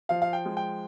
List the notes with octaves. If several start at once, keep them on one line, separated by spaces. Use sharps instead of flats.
F3 F5
F5
G5
G#3
G5